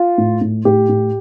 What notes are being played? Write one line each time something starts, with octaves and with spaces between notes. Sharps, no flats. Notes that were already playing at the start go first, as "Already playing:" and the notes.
Already playing: F4
A2
A2
A2 G4
A2